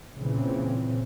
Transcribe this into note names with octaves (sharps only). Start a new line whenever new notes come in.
A#2 C#3 E3 C4